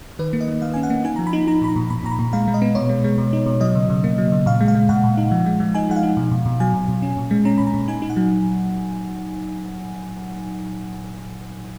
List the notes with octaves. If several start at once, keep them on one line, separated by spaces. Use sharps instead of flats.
D#3 B4
A#3
D#5
D#3
D#3 F5
C#4 G#5
F#5
A#3
D#4 G#5
A#5
F3
B5
D#4
D#4 A#5
A#2 B5
A#5
A#2
A#2 B5
A#2 A#5
B5
A#2
G#3 F5
G#3
D#5
B3
B2 C#5
G#3
G#3
B2
D#4
B2
F#3 D#5
C#3
C#3
A#3
F#3
C#3
A#2 F5
G#3
F5
G#3
A#2 F#5
A#2
D#4
F3
G#3
F3
D#4 G#5
G#3 F#5
F5
D#4
B2
B2
B2
F#3 G#5
B2
B2
C#4
A#2
G#3
C#4 A#5
A#2 B5
A#5
A#2
D#4 G#5
D#4
F#5
F#3